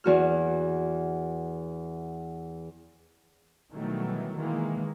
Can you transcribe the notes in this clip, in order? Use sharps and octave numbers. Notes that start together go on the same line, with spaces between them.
E2 F#4 F6
B2 D#3 E3 F#3 G3 A3
D#3 E3 G#3 A#3